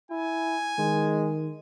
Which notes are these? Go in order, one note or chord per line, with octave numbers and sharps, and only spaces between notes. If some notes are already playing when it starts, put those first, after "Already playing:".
E4 G#5
D#3 G#3